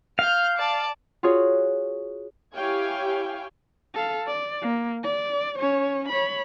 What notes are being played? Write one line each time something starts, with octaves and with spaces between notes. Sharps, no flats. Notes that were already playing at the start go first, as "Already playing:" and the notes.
F5 F6 G6
D5 A5
F4 F#4 G#4 C#5
E4 G4 C#5 F5 G5 G#5
A4 F5
D5
A#3
D5
C#4 C#5
C#5 B5